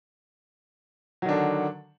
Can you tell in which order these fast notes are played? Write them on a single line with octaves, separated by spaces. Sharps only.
F#3 D#3 D4 D3